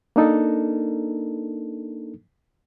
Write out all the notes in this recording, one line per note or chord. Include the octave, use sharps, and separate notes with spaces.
A#3 D4 D#4 A4 A#4